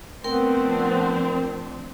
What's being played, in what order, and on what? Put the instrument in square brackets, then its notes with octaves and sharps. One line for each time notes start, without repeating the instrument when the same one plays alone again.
[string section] F3 C4 D4 [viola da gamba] A3 [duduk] B3 [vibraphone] A#4 G5 C6